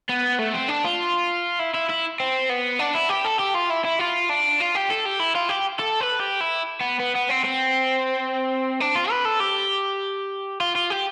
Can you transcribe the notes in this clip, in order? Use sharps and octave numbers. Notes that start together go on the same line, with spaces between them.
B3
A3
C4
D4
F4
E4
E4
E4
C4
B3
D4
E4
G4
A4
G4
F4
E4
E4
F4
D4
F4
G4
A4
G4
E4
F4
G4
A4
B4
G4
E4
B3
B3
B3
C4
C4
D4
F4
B4
A4
G4
F4
F4
G4